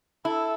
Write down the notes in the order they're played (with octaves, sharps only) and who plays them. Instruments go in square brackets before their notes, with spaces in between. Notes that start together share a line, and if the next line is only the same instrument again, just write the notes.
[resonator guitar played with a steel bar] E4 [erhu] A4